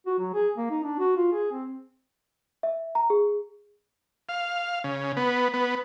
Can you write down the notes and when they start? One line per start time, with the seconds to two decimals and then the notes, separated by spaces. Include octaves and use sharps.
0.06 F#4
0.19 F#3
0.34 G#4
0.57 A#3
0.70 D#4
0.84 D4
0.99 F#4
1.16 F4
1.32 G#4
1.52 C4
2.63 E5
2.95 A#5
3.10 G#4
4.29 F5
4.84 C#3
5.17 B3
5.54 B3